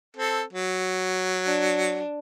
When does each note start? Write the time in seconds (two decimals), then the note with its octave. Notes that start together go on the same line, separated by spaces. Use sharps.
0.17 C4 A4
0.53 F#3
1.46 D4